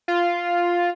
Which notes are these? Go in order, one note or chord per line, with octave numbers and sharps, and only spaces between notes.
F4